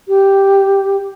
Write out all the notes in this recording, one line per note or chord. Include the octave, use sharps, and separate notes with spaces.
G4